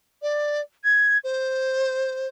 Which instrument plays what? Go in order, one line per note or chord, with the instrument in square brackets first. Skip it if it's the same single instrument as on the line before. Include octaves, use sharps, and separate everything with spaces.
[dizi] D5
G#6
C5